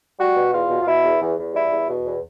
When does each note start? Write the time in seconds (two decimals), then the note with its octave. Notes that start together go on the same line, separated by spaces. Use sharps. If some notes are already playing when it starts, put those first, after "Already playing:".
0.19 G3 F#4
0.36 B2
0.53 E2 F4
0.69 B2
0.82 F4
0.87 B2 E4
1.04 E2
1.21 E2
1.38 E2
1.54 G3 E4
1.72 E2
1.88 B2
2.05 E2